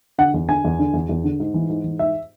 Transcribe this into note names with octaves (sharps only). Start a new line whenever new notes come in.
D3 F#5
E2
D3 G#5
E2
D3
E2
E2
D3
G#2
E3
G#2
E3
G#2 E5